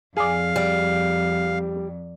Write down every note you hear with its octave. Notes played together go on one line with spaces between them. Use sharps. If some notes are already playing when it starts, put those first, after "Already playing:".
F2 G#4 D5 F5
G3